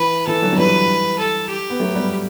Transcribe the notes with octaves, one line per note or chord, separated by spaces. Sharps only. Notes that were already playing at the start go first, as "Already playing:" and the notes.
Already playing: E3 B4
E3 A4
D3 F#3
F#3
E3 G3 B4
A4
G4
B3
F#3 A3
G3 B3